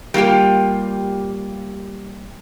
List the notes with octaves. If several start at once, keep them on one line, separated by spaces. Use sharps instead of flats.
G3 A#3 F4 G4